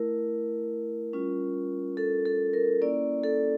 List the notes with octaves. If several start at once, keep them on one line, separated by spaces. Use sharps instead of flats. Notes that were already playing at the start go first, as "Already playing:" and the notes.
Already playing: A3 E4 A#4
G3 C#4 F4
A4
A4
A#4
A#3 C#4 E4 D5
A4